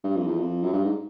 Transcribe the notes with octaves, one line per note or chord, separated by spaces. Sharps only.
G2
F2
E2
F2
F#2
G2
G#2